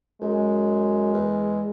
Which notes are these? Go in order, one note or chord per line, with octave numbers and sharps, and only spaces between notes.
F#2 G#3
E2